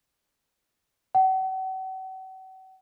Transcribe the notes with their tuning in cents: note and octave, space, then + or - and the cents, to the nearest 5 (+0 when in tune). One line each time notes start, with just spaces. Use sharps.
F#5 +40